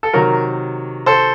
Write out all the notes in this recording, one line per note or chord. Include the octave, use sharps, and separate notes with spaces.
A4
C3 D#3 F#3 A#4
A4 C5